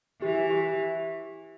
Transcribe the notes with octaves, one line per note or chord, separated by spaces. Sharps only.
E3 G4
G4